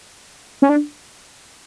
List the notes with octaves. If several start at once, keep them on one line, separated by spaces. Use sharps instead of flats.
C#4
D4